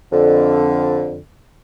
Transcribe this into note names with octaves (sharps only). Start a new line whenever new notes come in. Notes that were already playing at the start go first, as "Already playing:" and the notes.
F2 D3